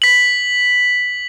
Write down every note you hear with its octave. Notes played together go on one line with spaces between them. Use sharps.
B6 F#7